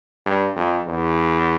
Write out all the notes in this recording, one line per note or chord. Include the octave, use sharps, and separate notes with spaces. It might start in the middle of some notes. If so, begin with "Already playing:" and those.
G2
F2
E2